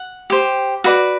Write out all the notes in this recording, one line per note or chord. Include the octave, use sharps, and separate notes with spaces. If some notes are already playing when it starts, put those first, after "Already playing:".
Already playing: F#5
G4 C5
F#4 B4 D5